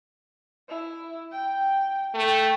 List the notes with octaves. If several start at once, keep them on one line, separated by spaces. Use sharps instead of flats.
E4
G5
A3 G5